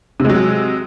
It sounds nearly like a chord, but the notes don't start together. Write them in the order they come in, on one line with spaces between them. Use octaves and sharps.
C3 G#3 F#3